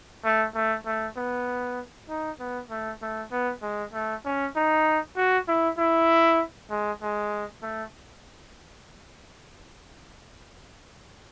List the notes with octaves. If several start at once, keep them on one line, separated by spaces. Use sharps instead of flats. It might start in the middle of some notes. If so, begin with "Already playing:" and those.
A3
A3
A3
B3
D#4
B3
A3
A3
B3
G#3
A3
C#4
D#4
F#4
E4
E4
G#3
G#3
A3